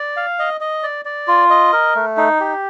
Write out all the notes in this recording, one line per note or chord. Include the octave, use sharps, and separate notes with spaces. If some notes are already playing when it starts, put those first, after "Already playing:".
Already playing: D5
F5
D#5
D#5
D5
D5
F4
D#5
A#4
A3
D#4
G4